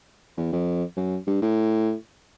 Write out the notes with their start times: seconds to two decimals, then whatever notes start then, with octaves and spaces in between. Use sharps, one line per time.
0.37 E2
0.52 F2
0.97 F#2
1.27 G2
1.42 A2